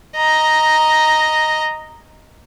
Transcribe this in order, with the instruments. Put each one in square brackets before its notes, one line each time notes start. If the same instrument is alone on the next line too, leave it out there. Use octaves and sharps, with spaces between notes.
[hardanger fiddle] D#5 A#5